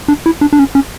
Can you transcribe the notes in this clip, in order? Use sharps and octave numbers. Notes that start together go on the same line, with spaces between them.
D4
E4
D4
D4
C#4
C#4